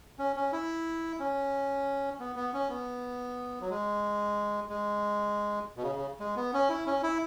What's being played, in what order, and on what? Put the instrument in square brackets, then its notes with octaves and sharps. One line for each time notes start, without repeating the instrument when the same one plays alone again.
[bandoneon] C#4
C#4
E4
C#4
B3
B3
C#4
B3
F#3
G#3
G#3
B2
C#3
C#3
G#3
B3
C#4
E4
C#4
E4